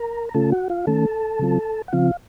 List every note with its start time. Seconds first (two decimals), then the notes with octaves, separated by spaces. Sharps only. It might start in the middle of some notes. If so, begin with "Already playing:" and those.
Already playing: A#4 A#5
0.29 A#5
0.34 C#3 A3 C#4 F4 A4 A5
0.52 F#4 F#5
0.70 F4 F5
0.87 D#3 A3 C#4 A4 A5
1.39 C#3 F#3 C4 F4
1.88 F#5
1.93 C#3 F3 C4 F4 F5